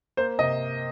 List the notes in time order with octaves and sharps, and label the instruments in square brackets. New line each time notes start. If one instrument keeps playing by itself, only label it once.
[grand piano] A#3 C5
C3 D#5